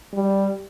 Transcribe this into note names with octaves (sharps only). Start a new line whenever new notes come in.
G3